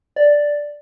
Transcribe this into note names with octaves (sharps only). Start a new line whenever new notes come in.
D5